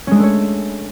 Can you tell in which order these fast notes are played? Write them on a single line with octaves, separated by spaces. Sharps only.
C#4 G#3 D4 A3 C#5